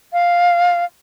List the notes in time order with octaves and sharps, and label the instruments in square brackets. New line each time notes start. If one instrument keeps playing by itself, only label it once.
[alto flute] F5